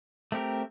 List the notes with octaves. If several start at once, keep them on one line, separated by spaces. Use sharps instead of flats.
A3 C4 G4 A#4